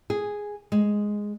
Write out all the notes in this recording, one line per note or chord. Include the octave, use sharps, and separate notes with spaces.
G#4
G#3